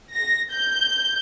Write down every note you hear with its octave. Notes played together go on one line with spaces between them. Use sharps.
A#6
G6